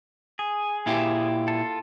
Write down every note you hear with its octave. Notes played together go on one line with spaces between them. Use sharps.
G#4
A#2 E4 G4
F4 A4